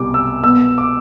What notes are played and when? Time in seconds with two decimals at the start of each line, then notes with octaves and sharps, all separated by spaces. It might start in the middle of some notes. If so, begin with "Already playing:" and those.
Already playing: C2 B2 G3 D6
0.14 E6
0.43 B2 B3 E6
0.78 D6